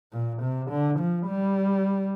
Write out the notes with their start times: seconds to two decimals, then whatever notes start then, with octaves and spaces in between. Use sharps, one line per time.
0.13 A#2
0.42 C3
0.70 D3
0.99 F3
1.27 G3